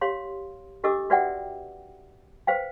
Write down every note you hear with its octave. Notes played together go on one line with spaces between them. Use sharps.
G4 C#5 F5 C6
D4 G4 A4 D#5 D6 E6
F#4 B4 D5 E5 F#5 G5
B4 C5 F5 G5